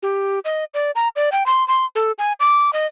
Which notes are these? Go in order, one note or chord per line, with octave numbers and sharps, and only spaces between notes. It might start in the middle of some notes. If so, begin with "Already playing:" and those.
G4
D#5
D5
A#5
D5
G5
C6
C6
A4
G#5
D6
D#5